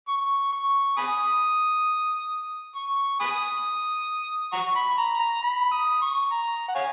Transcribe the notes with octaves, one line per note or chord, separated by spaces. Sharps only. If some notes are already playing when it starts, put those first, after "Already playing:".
C#6
C#6
G#5 B5 D#6
C#6
G#5 B5 D#6
F#5 A#5 C#6
B5
A#5
A#5
B5
D#6
C#6
A#5
F#5
C#5 F5 G#5